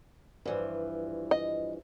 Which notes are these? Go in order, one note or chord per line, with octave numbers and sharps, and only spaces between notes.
G2 E3 F3
D#5